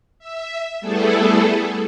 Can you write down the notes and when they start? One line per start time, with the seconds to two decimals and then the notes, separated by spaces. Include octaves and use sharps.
0.19 E5
0.80 G3 A3 B3 E4 G#4 A4